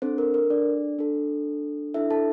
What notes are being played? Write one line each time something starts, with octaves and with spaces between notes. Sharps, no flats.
C4 D4 A4 C5
A#4
A#4
D4 D5
D4 A4
D4 E4 A4 E5
A4 A5